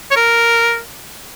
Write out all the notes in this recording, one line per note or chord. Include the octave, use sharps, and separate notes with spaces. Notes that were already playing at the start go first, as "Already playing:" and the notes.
C#5
A#4